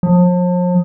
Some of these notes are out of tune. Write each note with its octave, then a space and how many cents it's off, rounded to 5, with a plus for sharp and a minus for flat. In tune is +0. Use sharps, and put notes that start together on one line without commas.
F3 +40